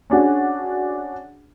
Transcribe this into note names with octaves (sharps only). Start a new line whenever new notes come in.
C#4 D4 F#4 G#4